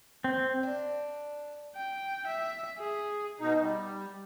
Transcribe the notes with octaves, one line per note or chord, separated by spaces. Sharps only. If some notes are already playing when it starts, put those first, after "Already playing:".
C4
D4
G5
E5
G#4
B2 D#4
G3